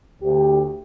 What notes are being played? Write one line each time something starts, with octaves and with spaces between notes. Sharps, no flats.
D2 G4